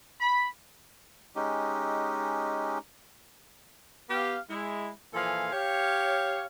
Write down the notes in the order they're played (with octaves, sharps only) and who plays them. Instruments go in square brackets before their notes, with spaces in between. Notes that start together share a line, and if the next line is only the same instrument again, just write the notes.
[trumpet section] B5
[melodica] G#3 C#4 D#4 G4
[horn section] B3 G4 F5
G#3 E4
A#2 E3 F3 A4 F5 G#5
G4 C#5 F5